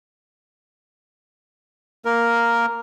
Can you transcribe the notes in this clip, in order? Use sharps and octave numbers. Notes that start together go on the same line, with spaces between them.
A#3 A#4